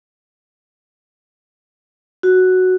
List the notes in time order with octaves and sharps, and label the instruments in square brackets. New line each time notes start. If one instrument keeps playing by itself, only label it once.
[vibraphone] F#4